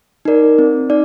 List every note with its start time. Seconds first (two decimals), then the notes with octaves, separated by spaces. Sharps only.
0.25 D#4 A#4 D5
0.59 C4
0.90 D#4 D5